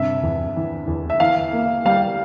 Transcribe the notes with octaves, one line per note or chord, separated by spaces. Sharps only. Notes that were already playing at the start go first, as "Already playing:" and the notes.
Already playing: G2 C3 E5
E2
E3
E2
E5
E3 F5
A#3
G3 F5